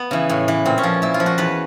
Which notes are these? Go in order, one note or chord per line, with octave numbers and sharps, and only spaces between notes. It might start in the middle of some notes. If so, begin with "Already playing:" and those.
Already playing: B3
C#3 E3
A2
E3
A#2 C4
C#4
F3
A#2 E4
F4
F3
F#4
E2 B4